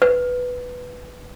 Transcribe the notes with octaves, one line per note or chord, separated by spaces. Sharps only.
B4